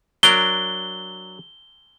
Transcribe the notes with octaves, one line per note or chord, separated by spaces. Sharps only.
F#3 D4 A#4 G7